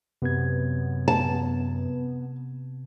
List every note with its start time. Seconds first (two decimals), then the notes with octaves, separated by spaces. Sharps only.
0.22 F#2 C3 B3 G#6
1.08 A5